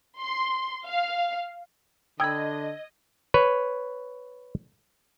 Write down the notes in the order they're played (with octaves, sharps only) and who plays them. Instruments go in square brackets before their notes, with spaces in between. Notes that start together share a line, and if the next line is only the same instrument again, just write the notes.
[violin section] C6
F5
[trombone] D3 [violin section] D#5 [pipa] G5 B5 [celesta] D#6 E6 G#6
[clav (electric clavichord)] B4 C#5